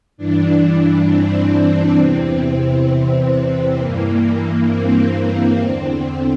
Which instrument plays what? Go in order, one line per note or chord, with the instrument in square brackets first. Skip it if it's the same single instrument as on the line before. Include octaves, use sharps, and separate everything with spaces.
[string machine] G2 E3 D4
C4
E2 C3 E3
G2 E3 A#3
C4
E2 D3